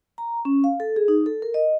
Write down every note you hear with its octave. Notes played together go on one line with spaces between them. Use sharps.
A#5
C#4
F5
A4
G#4
D#4
A4
A#4
D#5